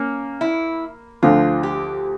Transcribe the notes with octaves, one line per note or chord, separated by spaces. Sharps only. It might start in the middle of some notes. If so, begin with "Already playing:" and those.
Already playing: A#3 C#4
E4
D2 D3 F3 F4
G4